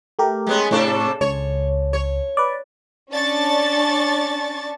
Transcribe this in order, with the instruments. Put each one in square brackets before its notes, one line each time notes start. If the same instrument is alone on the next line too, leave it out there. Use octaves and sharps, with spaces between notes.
[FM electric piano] A3 G4 A#4
[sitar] G#3 B3 C#4
[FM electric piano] A2 C#6 [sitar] C3 D4 A4
[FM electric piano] C#2 [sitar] C#5
[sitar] C#5
[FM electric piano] B4 D5
[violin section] C#4 D4 D5 A5 C#6 A6